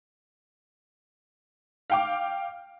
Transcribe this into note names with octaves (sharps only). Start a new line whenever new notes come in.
F5 G5 D6